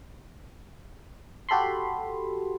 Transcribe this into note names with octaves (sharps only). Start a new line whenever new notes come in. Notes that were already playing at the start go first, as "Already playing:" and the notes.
F#4 G4 A4 B5 C6